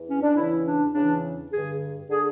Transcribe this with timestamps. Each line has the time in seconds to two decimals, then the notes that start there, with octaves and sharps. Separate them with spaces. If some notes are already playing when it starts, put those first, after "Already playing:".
Already playing: E2
0.08 C#4
0.22 D4
0.36 E2 C#3 E3 E4
0.66 D4
0.95 E2 C#3 E3 D4
1.52 G2 D3 G#4
2.10 D3 G#4